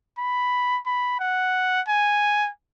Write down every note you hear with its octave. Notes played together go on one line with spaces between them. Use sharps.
B5
B5
F#5
G#5